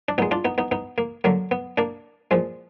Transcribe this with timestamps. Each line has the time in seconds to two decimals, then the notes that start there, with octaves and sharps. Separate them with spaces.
0.08 D4
0.18 A#2 G#3 B3 D#4
0.31 D4 F4
0.45 B3 D#4
0.58 B3 D#4
0.71 B3 D#4
0.98 A#3
1.24 D3 F#3 A#3
1.51 B3
1.78 A#3 D4
2.31 A#2 F3 G#3